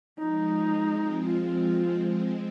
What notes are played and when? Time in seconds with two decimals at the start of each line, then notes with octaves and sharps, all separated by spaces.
0.18 F3 G#3 D#4
0.72 G#3 C4
1.25 F4